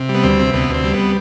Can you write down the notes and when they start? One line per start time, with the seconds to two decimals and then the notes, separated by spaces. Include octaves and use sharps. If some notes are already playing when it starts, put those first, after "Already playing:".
Already playing: C3
0.09 G3
0.14 B3
0.23 D2 C4
0.39 C3
0.53 D2 B3
0.69 D2 C4
0.84 G3
0.94 B3